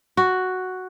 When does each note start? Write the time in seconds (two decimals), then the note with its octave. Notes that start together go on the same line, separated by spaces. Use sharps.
0.17 F#4